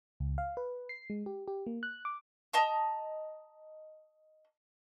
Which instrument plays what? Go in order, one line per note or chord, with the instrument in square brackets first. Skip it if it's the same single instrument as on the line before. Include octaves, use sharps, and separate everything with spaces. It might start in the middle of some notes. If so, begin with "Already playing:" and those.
[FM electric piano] C#2
F5
B4
C7
G#3
G4
G4
A#3
F#6
D6
[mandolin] D#5 A5 A#5